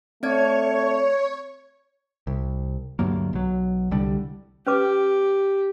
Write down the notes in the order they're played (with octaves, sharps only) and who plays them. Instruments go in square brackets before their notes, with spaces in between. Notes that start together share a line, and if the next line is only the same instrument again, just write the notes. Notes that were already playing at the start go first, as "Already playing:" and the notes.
[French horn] A3 [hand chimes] C4 D5 G#6 [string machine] C#5
[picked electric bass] C2
D2 G2 F#3 A#3
B1 F#3
C2 D3 G3
[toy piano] C#4 B4 D6 [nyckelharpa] G4